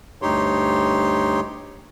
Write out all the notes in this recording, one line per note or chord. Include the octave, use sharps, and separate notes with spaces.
D2 G2 D#4 G4 C#5 C6